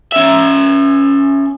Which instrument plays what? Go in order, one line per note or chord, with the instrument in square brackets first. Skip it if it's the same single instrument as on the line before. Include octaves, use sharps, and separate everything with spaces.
[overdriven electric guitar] C#4 E5